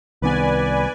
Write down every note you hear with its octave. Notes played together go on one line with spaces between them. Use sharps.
C2 D#3 B3 B4 D5 G#5